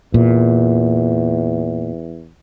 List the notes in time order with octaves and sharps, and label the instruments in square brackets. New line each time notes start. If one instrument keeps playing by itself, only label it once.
[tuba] E2 [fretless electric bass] A#2